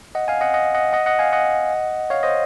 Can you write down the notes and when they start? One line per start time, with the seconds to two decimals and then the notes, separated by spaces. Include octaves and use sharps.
0.15 D#5 F#5
0.28 F5 G#5
0.41 D#5 F#5
0.54 D#5 F#5
0.74 D#5 F#5
0.93 D#5 F#5
1.06 D#5 F#5
1.19 F5 G#5
1.33 D#5 F#5
2.10 C#5 F5
2.23 C5 D#5